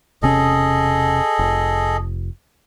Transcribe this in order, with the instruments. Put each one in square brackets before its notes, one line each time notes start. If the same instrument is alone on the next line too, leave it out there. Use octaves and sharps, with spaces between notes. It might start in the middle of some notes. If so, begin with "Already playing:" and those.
[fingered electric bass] E1 C3 C#4 [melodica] G#4 A4 D#5
[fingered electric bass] F1